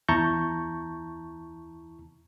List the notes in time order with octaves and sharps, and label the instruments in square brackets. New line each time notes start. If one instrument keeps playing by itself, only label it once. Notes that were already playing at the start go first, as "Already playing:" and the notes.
[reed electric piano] E2 E4 A5 A#5 C#6 G6